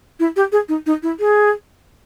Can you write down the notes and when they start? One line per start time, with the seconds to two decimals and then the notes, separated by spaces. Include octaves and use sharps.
0.20 E4
0.36 G4
0.52 G#4
0.69 D#4
0.86 D#4
1.03 E4
1.20 G#4